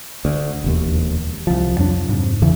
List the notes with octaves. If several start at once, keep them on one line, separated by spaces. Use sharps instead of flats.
D2
E1 D#2
C2 F3
F2 F#3 D4
G#2 C3
E2 C#3 E3